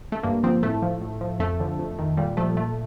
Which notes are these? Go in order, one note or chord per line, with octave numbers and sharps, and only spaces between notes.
A3
G2 A#3
D3 F3 C4
A2 A3
F3
A2
F3
F2 A3
D3 F3
F2
D#3
A#2 G3
F3 A3
A#2 A3